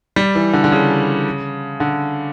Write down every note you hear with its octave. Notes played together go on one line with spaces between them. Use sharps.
G3
E3
D3
D3
C#3
D3